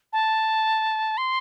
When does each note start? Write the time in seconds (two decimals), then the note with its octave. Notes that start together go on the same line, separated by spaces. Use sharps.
0.13 A5
1.18 C6